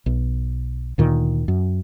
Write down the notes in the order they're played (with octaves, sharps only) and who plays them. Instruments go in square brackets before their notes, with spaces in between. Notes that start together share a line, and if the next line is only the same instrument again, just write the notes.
[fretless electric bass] B1
D2 A#2 D#3
F#2